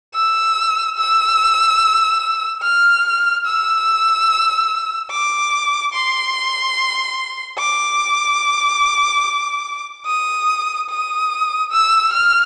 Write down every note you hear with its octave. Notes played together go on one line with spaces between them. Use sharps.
E6
E6
F6
E6
D6
C6
D6
D#6
D#6
E6
F6